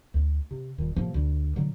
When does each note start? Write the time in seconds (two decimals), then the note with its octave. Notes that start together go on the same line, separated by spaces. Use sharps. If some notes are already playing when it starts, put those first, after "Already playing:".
0.14 D2
0.51 C3
0.78 D#1 A#2 D#3
0.96 A2 C3 F3 A#3
1.14 D2
1.56 A#2 D3 F#3